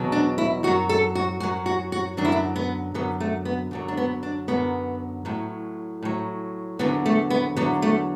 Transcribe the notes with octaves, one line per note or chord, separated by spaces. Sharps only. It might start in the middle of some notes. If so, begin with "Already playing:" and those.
Already playing: E2 B2 F#3
D4
E4
F#2 F#3 F#4
A4
F#4
F#2 F#3 F#4
F#4
F#4
F#2 D3 F#3 D4
E4
D4
B3
F#2 D3 F#3 B3
A3
B3
F#2 D3 F#3
D4
B3
D4
F#2 D3 F#3 B3
A2 F#3
A2 F#3
E2 D3 F#3 B3
A3
B3
E2 D3 F#3 B3
A3